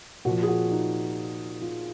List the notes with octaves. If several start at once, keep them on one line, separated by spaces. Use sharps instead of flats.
A#2 F3 F#4
G#4
F#4
D#4
F4